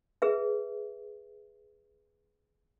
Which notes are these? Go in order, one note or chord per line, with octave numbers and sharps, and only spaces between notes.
G#4 B4 E5